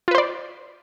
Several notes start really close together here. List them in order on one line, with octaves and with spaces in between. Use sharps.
F4 B4 C5 D5